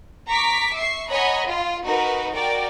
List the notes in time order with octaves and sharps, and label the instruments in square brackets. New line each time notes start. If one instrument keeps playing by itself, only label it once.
[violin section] A#5 C#6 D6 B6
E5 C#6 C7
C#5 D#5 F#5 G#5 A#5 B5
F4
D#4 F#4 A#4 B4
F#4 A#4 D5 G5